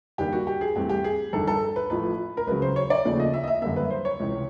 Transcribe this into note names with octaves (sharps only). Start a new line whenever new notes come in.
G2 D#3 G3 A#3 G4
F#4
G4
G#4
G2 E3 A3 C4 G4
G4
G#4
G1 G2 D#3 A4
A4
B4
A1 A2 F3 A3 B4
A#4
C#2 C#3 F#3 B4
C5
C#5
D5
D#2 C#3 F3 A3
D#5
E5
D#5
E5
F#2 D3 G3 A#3 E5
B4
C5
C#5
C#2 C3 E3